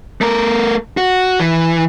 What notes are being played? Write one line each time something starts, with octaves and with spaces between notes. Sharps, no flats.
A3 A#4
F#4
E3